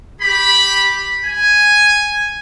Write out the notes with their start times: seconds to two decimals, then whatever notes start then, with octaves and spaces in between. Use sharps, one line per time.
0.21 G4 B5
1.24 G#5